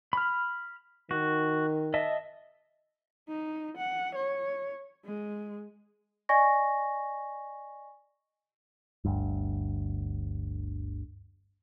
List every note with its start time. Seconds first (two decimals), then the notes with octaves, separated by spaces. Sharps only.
0.13 B5 F6
1.11 D#3 F#4
1.94 D#5 E5 A5
3.28 D#4
3.77 F#5
4.15 C#5
5.06 G#3
6.29 D5 D#5 G#5 C#6 A#6
9.05 G1 D2 G2